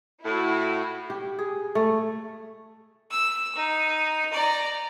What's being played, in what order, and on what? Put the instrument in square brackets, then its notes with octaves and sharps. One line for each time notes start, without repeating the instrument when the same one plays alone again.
[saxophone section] A2 [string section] E4 F#4
[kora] G4
G#4
A3
[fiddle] E6
D#4
D5 A#5